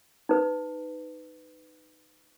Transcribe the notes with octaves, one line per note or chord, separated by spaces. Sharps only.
D#4 B4